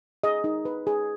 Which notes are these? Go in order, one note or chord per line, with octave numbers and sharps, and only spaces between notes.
G#4 D#5
D#4
B4
G#4